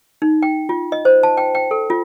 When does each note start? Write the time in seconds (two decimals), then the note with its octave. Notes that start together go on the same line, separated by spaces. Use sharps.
0.22 D#4
0.42 G5
0.69 F4
0.92 D#5
1.05 C5
1.23 A5
1.37 G5
1.55 G5
1.71 A4
1.90 F4